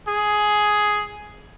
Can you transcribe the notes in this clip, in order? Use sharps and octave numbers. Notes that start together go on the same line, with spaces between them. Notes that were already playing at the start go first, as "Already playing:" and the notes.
G#4